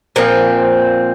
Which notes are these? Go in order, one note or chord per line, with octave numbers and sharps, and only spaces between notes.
A#2 F3 C4